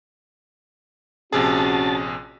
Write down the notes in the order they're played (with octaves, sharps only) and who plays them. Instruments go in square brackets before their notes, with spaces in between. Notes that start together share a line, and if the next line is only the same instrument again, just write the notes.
[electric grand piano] A#1 C3 G#4 [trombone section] C#4 F#4 [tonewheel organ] A5